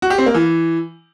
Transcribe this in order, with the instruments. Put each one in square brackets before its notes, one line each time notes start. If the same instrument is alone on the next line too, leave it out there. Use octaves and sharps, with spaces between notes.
[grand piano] F#4
G4
C4
A#3
E3